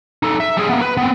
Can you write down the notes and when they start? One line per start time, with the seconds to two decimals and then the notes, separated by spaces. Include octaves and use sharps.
0.23 D#4 A4
0.40 E5
0.57 G3 G#4
0.69 A#3 B3
0.82 B4
0.97 B3 C4